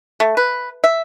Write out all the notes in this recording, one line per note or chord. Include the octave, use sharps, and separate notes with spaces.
A3
B4
E5